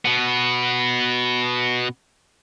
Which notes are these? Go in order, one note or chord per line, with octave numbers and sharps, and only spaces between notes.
B2 B3